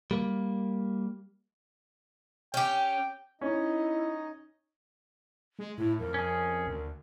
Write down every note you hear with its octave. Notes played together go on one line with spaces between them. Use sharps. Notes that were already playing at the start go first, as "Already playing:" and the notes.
G3 A#3
C#4 G4 G5
C#4 D#4 E4 D#5
G#3
A2 E4
F2 A#4
C#4 G#4
D2